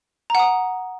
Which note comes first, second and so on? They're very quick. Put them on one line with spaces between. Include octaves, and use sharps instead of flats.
A#5 F#5 D#6